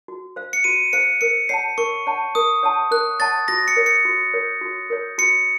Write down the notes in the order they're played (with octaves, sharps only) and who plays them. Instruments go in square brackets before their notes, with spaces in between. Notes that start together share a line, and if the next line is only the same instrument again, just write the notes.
[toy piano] F#4
C5 F5
[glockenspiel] C#7
[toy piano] F#4 [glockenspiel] D#7
[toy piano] C5 F5 [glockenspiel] C#7
[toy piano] A#4 [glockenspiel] C#7
[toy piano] C#5 F#5 A5 [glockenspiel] C7
[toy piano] A#4 [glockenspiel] C#6
[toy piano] C#5 F#5 A5
[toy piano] A#4 [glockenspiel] D#6
[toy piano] C#5 F#5 A5
[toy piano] A#4 [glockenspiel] F#6
[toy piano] C#5 F#5 A5 [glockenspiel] A6
[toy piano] F#4 [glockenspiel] A#6
[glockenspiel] C#7
[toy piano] A#4 C#5
[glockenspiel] C#7
[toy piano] F#4
A#4 C#5
F#4
A#4 C#5
[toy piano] F#4 [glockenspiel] C#7